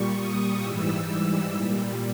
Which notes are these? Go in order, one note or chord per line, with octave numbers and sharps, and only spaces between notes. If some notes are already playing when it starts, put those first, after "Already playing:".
Already playing: A#2 G3 C#6
D#6
G#2 E3 G3 E6
A#2 G3